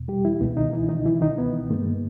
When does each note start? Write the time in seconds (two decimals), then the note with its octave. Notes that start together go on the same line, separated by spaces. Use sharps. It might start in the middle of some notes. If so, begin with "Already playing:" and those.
Already playing: E2 B2
0.08 G3 G4
0.25 E3 E4
0.41 C#2 B2 G#3 B3
0.57 D#3 D#4
0.73 E3 E4
0.89 D#3 D#4
1.05 E3 E4
1.21 D#3 D#4
1.38 B3
1.70 G2 D#3 G#3 A#3